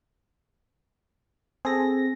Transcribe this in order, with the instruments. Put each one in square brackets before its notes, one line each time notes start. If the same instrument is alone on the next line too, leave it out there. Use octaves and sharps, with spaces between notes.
[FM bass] C4 [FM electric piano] G#4 A4 A#6